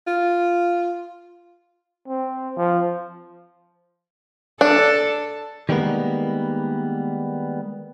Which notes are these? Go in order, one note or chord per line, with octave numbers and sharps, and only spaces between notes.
F4
C4
F3
D4 A4
D#3 G3 G#3 A#3 B3